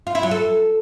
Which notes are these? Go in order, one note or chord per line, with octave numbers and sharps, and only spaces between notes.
F4
E4
F#3
A4